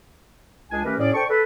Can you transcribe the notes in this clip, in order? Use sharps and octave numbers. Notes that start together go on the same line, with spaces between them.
C#2 D4 G#4 G#5
D#3 A3 C#4 G4 A#4 B4
A2 C#4 G#4 D5
D4 A4 C5 D5 G5 C#6
A4 B4